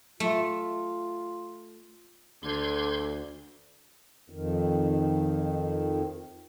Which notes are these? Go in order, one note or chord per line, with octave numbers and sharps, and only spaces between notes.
A3 F4
D2 D3 C6 G6 G#6
F2 D#3